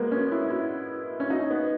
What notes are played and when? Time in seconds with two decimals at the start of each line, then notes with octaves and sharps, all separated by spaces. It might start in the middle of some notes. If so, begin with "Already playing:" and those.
Already playing: G#3 A#3 B3
0.12 C#4
0.32 E4
0.50 E4
1.20 C#4
1.30 D#4
1.51 B3